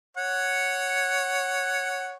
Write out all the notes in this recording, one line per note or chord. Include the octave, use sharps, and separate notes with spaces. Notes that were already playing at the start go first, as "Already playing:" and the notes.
C#5 F#5